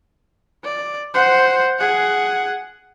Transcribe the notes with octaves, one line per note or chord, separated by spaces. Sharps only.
D5
C5 F#5
G#4 F#5